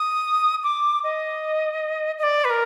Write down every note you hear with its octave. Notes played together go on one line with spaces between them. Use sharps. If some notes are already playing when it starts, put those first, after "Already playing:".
Already playing: D#6
D6
D#5
D#5
D5
B4
A#4